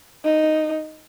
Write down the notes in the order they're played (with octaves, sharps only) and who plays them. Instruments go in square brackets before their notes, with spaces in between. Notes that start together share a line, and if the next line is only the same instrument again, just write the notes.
[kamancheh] D#4